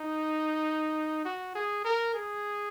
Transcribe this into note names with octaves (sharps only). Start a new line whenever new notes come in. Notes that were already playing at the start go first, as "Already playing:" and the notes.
Already playing: D#4
F#4
G#4
A#4
G#4